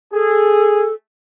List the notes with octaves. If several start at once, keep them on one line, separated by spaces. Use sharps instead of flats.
G#4 A4